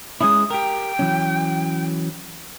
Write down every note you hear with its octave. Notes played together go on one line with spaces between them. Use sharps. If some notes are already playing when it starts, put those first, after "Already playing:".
G#3 C#4 E4 D#6
G4 A#4 G5
E3 F#3 C#4